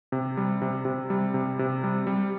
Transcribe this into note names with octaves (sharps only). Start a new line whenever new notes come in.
C3
G3
C3
C3
G3
C3
C3
G3
G3